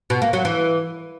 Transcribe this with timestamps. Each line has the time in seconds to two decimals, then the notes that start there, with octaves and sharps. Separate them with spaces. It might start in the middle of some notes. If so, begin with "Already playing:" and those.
0.10 B2
0.22 A#3
0.33 F#3
0.45 E3